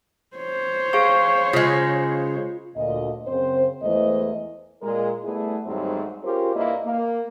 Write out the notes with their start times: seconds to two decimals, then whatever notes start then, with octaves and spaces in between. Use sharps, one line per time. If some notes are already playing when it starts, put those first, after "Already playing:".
0.36 C5 C#5
0.93 G#4 F5 C#6
1.53 C#3 G#3 F4
2.76 D2 A#2 D#5
3.27 F#2 C#3 C4 C5
3.83 E2 E3 G#3 A3 C5 D#5
4.83 A#2 G#3 A#4
5.24 G3 A3 B3 E4 G#4
5.66 D#2 G#2 F#3 G3 A3 C4
6.24 C#4 F4 G4 G#4 A#4 C5
6.56 G2 A#3 E4 D5 D#5
6.86 A#3